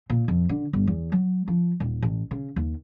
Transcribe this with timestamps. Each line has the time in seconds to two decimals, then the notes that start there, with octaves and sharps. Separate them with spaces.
0.10 A#2
0.28 F2
0.49 D3
0.73 G1
0.87 E2
1.12 F#3
1.48 F3
1.80 D#1
2.02 A1
2.31 C#3
2.56 D#2